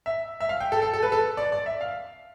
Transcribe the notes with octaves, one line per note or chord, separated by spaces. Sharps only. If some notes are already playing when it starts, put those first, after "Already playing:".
E5
E5
F5
G5
A4
A4
A4
B4
A4
D5
D5
E5
F5